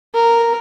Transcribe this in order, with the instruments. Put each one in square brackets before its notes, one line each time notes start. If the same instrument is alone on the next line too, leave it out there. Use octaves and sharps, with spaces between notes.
[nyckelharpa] A#4